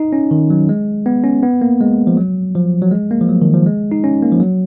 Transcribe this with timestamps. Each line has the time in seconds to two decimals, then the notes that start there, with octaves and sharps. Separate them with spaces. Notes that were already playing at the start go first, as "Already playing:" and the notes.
Already playing: D#4
0.13 C#4
0.31 D#3
0.50 F#3
0.69 G#3
1.06 B3
1.24 C#4
1.43 B3
1.62 A#3
1.81 G#3
2.07 F3
2.17 F#3
2.55 F3
2.82 F#3
2.91 G#3
3.11 A#3
3.21 F3
3.29 F#3
3.42 D#3
3.54 F3
3.66 G#3
3.92 D#4
4.04 C#4
4.22 A#3
4.32 F3
4.40 F#3